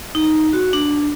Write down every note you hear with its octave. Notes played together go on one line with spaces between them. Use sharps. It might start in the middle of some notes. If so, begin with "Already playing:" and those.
D#4
F#4
D4